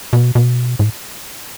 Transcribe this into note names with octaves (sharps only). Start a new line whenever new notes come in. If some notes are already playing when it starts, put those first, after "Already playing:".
B2
B2
A2